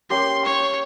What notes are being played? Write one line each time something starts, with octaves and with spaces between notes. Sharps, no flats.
A#3 C#4 G4 C6
C#5